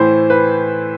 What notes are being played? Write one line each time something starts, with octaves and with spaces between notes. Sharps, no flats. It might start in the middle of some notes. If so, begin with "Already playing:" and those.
Already playing: A2 E3 C5
B4